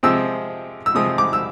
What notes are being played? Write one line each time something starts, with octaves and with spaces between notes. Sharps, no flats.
C3 F3 G#3 C4 E6
E6
C3 F3 G#3 C4 D#6
D6
E6